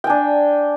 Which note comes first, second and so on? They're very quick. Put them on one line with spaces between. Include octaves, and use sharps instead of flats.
G5 G#5 D4